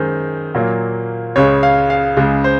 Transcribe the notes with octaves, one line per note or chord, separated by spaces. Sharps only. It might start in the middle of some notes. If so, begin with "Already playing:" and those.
Already playing: F#2 D#3 G#3 C5
A#2 F#3 A#3
C#2 C#3 G#3 C#5
F5
F5
C#2 C#3 G#3
C5